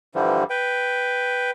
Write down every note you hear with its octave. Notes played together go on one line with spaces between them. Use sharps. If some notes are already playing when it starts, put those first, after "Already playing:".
G2 D3 E3 F3 G3
B4 G5